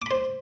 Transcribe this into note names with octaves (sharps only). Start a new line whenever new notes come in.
C5 B5 D6